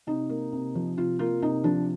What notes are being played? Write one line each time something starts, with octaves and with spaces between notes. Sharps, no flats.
C3 D#4
A#3
C3
F3
C3 F4
A#3 F4
C3 D#4
F3 D4